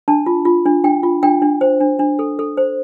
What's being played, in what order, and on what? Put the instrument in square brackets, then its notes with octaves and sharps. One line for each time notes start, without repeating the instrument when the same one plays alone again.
[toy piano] D4 A5
F4
F4
D4
D4 G5
F4
D4 G5
D4
C5
D4
D4
A4
A4
C5